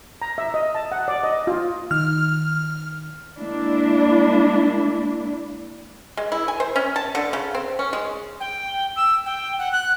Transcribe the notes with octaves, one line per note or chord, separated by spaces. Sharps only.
A#5
E5
D#5
A5
F#5
D5
D#5
F4
D#3 F6
G#3 A#3 D4 E4
G#3
E4
G#5
C5
C#4
A5
D3
C#3
C4
C#4
G#3
G5
E6
G5
F#5
F#6